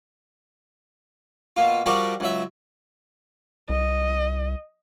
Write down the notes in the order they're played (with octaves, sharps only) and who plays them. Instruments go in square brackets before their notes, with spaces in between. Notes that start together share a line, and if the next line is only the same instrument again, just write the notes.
[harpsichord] B2 A#3 F4
F3 G3 F#4 G4 A#4 D5
C#2 F#3 E5
[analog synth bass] C2 [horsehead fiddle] D#5